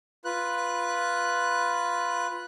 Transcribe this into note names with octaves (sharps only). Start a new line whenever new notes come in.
F4 B4 F#6